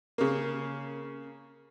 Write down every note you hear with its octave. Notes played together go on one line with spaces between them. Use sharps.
C#3 A#3